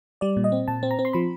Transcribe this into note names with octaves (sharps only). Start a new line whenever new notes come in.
G3 D5
A#2
D#5
C4
A#2 A5
C4
A#5
C4
C6
F3 B5